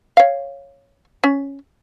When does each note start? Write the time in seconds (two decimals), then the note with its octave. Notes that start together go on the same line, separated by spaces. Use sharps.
0.17 C#5 F5
1.24 C#4